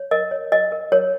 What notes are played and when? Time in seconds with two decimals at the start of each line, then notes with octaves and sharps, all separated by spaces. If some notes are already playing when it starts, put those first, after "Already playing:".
Already playing: C#5
0.11 A#4 D#5
0.31 C#5
0.52 A#4 D#5
0.72 A#4
0.92 A#4 C#5